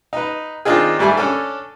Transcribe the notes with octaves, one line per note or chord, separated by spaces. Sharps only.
D#4 B4
D#3 C4 D4 D#4 F4 G#4
G#2 G3 A3 G#5
C#4 D4 A4